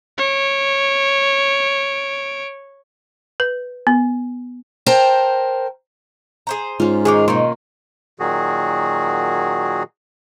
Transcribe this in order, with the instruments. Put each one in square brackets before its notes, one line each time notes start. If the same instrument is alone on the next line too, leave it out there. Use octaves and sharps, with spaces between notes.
[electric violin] C#5 D7
[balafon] B4
B3
[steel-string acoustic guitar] A#4 C5 G5 A5 A#5
[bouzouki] G#4 C5 A#5
[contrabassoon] G#2 [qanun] C#4 F4
[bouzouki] D#3 G#3 A#4 [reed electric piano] G#4 D6
[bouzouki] B2 D#3 [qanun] A#3 [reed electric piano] C6
[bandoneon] A#2 D#3 F#3 F#4 G#4